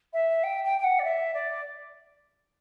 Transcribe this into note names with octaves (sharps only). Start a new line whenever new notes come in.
E5
G5
G5
G5
F#5
D5
E5
D5